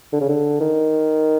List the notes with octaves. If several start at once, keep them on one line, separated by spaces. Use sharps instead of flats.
D3
C#3
D3
D#3